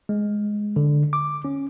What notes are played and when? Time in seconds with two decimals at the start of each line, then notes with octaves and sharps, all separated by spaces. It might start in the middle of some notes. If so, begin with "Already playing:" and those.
0.09 G#3
0.76 D3
1.13 D6
1.45 C#4